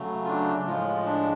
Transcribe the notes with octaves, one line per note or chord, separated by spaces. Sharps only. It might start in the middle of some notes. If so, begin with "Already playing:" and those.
Already playing: C#3 F#3 A3
F4
D4
A2 F3 G#3 F4
D4